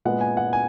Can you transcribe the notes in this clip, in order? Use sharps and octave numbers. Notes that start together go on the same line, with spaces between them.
A#2 G#3 B3 F#5
G#5
F#5
G#5